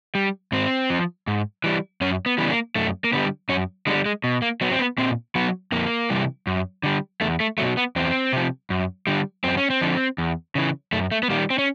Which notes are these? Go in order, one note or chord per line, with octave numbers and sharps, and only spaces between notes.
G3
G#2 C4
F3
G#2
E3 G3
F#2 C#4
B3
C#3 E3 G3 B3
A#3
F#2 A3
A#3
D3 G3 B3
F#2 C#4
D3 G3 G#3
G#3
B2
A#3
F#3 B3
C4
B3
A#2 C4
F#3 B3
F2 A#3
C3 E3 G3
F#2
D3 G3
E2 A3
A3
B2 F#3 A3
B3
E2 C4
C3 F3
F#2
D3 G3
F#2 C4
C#4
C4
D3 F3
E2
C#3 E3
F#2 A3
A3
B3
D#3 G3 A#3
C4
C#4